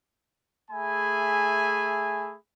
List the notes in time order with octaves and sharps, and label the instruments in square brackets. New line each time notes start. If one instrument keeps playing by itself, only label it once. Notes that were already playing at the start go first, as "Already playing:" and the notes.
[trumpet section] A3 G#4 E5 G#5 B5